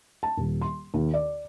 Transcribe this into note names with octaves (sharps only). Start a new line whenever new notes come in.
A5
D#1
C6
D#2
D5